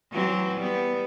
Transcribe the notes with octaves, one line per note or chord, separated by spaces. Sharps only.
E3 F#3 C4
G3 B3